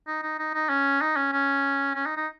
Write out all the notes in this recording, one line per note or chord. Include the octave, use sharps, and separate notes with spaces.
D#4
D#4
D#4
D#4
C#4
D#4
C#4
C#4
C#4
D#4
D#4